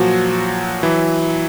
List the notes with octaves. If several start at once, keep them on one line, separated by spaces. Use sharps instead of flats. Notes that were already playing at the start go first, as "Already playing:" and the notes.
Already playing: A#2 F3 F#3 F#4
E3 F#3 E4